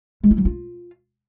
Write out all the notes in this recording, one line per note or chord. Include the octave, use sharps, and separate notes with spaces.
G#3
E4
F#3
F4